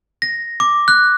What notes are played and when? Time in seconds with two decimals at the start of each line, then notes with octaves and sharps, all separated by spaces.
0.22 A#6
0.60 D6
0.88 F#6